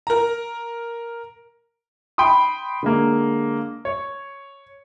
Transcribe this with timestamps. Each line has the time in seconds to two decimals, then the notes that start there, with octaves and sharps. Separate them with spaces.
0.07 A#4 A#5
2.18 G5 B5 C6 D#6
2.83 D3 G#3 A#3
3.85 C#5